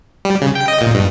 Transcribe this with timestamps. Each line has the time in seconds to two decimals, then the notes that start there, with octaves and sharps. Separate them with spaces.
0.25 G3
0.42 C#3
0.55 G5
0.68 D#5
0.81 A#2
0.95 G2